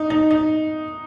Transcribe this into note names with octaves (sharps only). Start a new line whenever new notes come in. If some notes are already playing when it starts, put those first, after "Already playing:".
Already playing: D#4
D#4
D#4